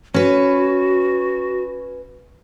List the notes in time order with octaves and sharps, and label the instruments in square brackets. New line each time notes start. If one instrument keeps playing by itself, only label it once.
[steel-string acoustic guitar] C#4 B4 [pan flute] F#4